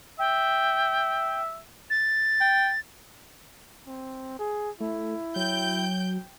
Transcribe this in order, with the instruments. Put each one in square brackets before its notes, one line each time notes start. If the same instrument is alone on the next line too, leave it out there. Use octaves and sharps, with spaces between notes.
[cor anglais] E5 [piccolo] G5
[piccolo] A6
[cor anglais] G5
[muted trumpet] C4
G#4
[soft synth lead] A3 [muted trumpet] E4
[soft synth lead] F#3 [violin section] G5 G6